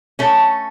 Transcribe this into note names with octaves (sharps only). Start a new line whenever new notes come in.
A3 C#4